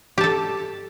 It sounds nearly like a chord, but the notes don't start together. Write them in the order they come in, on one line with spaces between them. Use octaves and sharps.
G4 A5 A4